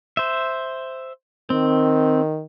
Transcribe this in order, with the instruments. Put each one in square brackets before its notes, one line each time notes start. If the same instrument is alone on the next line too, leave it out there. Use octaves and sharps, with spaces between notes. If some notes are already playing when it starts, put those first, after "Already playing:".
[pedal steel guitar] C5 E5
[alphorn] D#3 [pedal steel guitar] C4